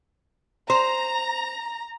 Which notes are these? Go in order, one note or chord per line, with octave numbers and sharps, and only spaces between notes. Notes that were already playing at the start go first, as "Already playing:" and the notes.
C5 A#5